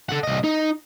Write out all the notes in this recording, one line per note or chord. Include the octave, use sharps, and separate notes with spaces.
A4 F#5
C2 D#5
D#4